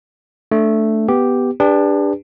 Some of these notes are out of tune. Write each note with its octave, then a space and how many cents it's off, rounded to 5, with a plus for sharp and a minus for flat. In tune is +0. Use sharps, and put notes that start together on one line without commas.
A3 +0 D4 +0
B3 +0 G4 +0
D4 +0 G4 +40 B4 +0